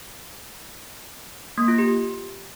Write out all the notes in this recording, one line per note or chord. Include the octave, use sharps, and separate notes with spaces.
A#3
F4
G4